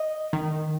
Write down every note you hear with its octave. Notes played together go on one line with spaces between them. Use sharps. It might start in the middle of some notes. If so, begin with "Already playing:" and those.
Already playing: D#5
D#3